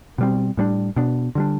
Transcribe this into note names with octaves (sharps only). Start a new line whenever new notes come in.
B2 G3 C4
A2 G3 B3 D4
B2 B3 D4
D3 G3 D4